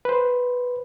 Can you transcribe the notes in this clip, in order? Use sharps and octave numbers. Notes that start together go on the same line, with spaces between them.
B4 C5